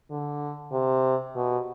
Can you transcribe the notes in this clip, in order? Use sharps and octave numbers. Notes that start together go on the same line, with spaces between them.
D3
C3
B2